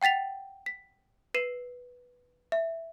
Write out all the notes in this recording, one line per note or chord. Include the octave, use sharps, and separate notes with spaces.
F#5 G5 A6 B6 F7
B6
B4 C7 D#7 E7
E5